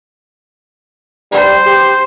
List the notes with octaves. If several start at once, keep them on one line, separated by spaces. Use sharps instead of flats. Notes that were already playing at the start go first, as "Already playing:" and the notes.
G3 C5
G4